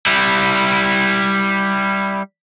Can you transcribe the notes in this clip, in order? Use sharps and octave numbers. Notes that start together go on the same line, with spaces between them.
G3 E4